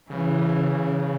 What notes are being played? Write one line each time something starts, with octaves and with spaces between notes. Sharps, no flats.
C#3 E3